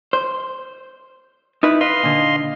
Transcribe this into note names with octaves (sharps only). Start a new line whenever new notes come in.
C5
D#4 E4 B4
B4 D#5 F5 C6
A#2 D3